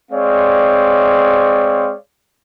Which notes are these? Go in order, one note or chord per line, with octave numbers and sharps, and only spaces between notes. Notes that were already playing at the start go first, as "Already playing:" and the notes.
G#3 C4 C#5 D5 F5